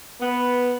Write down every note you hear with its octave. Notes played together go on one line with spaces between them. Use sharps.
B3